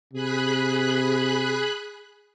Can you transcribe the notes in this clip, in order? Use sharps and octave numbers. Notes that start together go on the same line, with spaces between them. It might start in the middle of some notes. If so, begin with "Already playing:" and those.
C3 G#4 B5 F#6